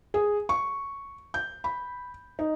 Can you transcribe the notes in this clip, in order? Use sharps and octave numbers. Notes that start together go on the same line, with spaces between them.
G#4
C#6
G6
B5
D#4